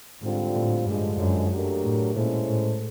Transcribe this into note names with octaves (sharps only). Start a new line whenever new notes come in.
G#2 D3 G3 C4 F4
A2
G2 D3 F3 G#3
F#2
F#3 A3 D4 G4 A#4
A2
A#2 G#3 C#4 E4 A4 C5
A2